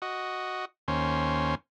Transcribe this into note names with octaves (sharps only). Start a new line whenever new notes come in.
F#4 D#5
D#2 C#4 C5